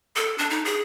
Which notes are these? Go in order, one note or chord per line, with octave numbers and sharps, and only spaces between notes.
A4
D4
D#4
G#4